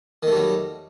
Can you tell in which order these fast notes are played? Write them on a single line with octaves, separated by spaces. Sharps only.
D#3 A3 G3 F#3